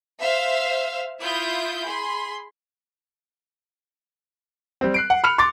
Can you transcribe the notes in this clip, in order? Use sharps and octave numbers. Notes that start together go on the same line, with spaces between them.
C5 E5 F5 E6
E4 F4 E5 D#6 G6
G#4 B5 C6
G3 C4
F#6 C7 D7
F#5
B5 F6 C#7 F7
C6 D6 A6